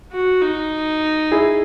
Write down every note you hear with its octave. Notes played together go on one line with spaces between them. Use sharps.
F#4
D#4
E4 G#4